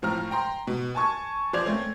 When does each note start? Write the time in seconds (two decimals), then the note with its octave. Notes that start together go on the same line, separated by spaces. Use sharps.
0.02 A2 F3 C4 A#5 F6
0.31 G5 A#5 C6
0.67 B2
0.95 G#5 A5 C#6 G#6
1.53 F3 C5 D5 G#6 F7
1.65 A3 C4 C#4